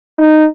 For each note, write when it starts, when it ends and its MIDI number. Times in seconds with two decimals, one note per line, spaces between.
0.18 0.46 63